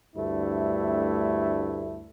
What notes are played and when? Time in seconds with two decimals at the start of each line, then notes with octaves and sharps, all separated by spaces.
0.16 D2 G2 A3 E4